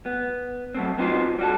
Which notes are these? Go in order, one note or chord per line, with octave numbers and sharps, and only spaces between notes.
B3
F#3 A3 C4
B3 C4 D#4 F4 F#4 C5
G3 F#4 A4